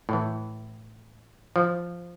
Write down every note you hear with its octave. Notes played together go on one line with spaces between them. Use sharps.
A2 E3
F3